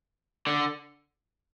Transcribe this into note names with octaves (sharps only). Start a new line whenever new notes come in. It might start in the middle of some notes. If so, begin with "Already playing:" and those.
D3